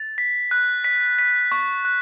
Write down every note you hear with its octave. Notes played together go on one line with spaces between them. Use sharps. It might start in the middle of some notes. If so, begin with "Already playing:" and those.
Already playing: A6
B6
F#6
B6
B6
C#6
F#6